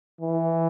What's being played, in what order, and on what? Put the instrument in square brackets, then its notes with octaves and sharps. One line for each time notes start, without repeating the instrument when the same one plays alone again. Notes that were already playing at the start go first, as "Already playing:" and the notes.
[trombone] E3